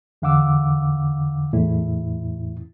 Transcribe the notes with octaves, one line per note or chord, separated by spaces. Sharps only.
E2 D3 F5 F#5 D6 E6
E2 A2 E4